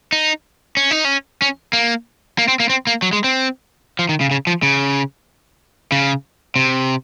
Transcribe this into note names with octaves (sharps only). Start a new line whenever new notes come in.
D#4
C#4
D#4
C#4
C#4
A#3
A#3
C4
A#3
C4
A#3
F#3
G#3
C4
F3
D#3
C#3
C#3
F3
C#3
C#3
C3